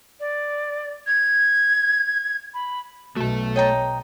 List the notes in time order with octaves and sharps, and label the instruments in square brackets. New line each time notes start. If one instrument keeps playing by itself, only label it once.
[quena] D5
G#6
B5
[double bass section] B1 B2 [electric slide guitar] A3 A4 [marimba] F#4
[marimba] C#5 A6 [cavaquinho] D#5 G5 A#5